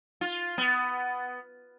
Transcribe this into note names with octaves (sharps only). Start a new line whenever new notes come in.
F4
B3